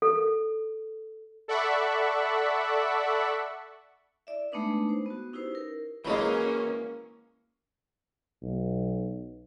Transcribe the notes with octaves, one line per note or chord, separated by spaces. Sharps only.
A4
A4 D5 E5 F#5 B5 C#6
E4 D5 E5
G#3 A3 B3 D4 D#4 B4
C5
B3 F#4
C#4 D#4 E4 G4 B4 C5
A#4
E3 F#3 G#3 A#3 C#4
B1